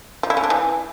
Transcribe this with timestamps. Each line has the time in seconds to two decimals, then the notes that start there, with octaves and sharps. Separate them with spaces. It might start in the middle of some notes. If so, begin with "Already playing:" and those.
0.23 F3
0.30 E4
0.37 C#4
0.44 D4
0.50 E3